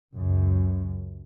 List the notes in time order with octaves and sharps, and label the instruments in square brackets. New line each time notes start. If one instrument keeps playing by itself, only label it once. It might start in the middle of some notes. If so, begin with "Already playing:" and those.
[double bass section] C#2 F#2 C#3